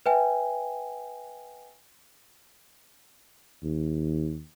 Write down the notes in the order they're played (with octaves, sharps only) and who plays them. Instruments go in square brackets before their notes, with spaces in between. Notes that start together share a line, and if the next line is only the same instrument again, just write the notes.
[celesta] B4 E5 G5 G#5
[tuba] D#2